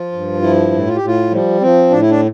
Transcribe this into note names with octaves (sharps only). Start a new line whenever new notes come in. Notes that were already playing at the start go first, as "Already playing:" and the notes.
Already playing: F3 F4
G2
F3 E4
A2
F4
G4
A2
F4
F3 G3
F3 C4
A2 D4
E4
D4